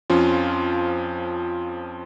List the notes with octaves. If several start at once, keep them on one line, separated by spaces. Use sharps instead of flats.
F2 F3 C#4 F4